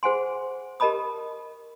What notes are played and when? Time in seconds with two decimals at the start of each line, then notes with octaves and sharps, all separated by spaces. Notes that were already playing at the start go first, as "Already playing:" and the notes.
0.03 G#4 C5 F#5 G#5 C6
0.80 G4 A#4 D#5 A5 B5 D#6